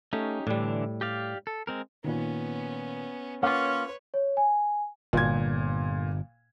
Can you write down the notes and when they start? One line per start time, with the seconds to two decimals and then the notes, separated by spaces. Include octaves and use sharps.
0.13 A3 C#4 D#4 G4
0.47 A2 D3 E3 G3 D4
1.01 G4 D5 F5
1.47 A4
1.67 G#3 C4 A#4
2.04 A#2 D#3 B3 C#4
3.43 A#3 C#4 F4 B4 C#5 F#5
4.14 C#5
4.37 G#5
5.13 G1 A#2 G#6